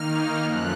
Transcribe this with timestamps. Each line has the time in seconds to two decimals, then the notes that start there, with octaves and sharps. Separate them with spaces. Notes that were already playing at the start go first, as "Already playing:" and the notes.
Already playing: D#3 A#3 D#4 F6
0.42 F#2 F3 A3 F#6